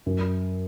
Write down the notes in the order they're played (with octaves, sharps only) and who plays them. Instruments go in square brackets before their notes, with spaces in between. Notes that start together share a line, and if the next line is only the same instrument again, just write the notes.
[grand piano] F#2